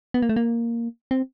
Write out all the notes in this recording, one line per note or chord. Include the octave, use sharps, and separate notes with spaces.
B3
A#3
A3
A#3
C4